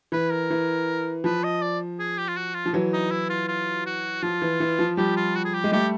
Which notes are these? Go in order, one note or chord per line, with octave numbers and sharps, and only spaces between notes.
E3 B4
A#4
E3
F3 B4
D#5
D5
G#4
G4
F4
F#4
F4
F3
E3 F#3
D#4
E4
F4
F4
F#4
F3 F4
E3
E3
F3
F3 G3 G4
F4
F#4
G#4
G4
G#3
G3 A3 G4